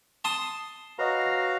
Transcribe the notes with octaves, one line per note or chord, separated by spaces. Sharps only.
A5 C6 D#6
F#4 B4 C#5 D#5 F5 A#5